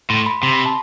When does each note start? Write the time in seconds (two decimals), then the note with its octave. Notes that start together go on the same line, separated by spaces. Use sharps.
0.09 A2 C6
0.26 B5
0.43 C3 C6
0.54 B5
0.66 A5